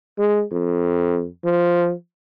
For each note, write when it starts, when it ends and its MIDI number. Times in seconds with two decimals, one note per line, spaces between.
0.18 0.43 56
0.52 1.27 41
1.45 1.93 53